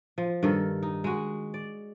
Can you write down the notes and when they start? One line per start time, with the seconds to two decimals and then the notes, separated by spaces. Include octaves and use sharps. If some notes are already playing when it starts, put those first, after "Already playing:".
0.18 F3
0.43 G2 D#3 A4
0.82 D#4
1.04 G#3 F#4
1.54 D5